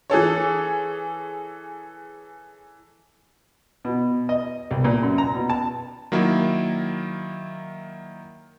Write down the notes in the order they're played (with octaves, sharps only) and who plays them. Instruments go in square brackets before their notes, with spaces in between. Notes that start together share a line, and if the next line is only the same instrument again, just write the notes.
[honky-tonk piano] E3 G#4 A4 C#5
[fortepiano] B2
D#5
C2
A#2
F#2
A#5
B2
A5
[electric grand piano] D#3 F#3 A#3 E4